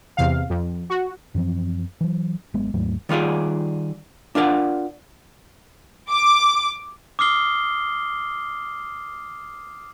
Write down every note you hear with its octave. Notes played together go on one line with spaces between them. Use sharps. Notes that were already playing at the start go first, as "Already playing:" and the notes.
E2 C3 F5
F2
F#4
F#2 E3 F3 C4
E3 F#3
G#1 F#3 G#3 B3
D#2 G#2 F#3 A3
D#3 G3 F4 G#4 D5
D4 F4 A#4 D5 F#5
D6
D6 D#6 F6 C7 G7